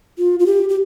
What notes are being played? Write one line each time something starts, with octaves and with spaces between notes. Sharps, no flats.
F4
F4
G4
G4